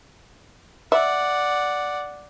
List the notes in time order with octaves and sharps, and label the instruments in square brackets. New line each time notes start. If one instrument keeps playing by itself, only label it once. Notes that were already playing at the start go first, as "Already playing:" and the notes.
[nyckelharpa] D5 F#5 [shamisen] E5